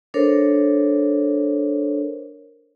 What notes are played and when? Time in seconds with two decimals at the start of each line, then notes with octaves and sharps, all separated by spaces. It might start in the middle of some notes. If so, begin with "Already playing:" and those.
0.14 D4 A4 A#4 C5 C#5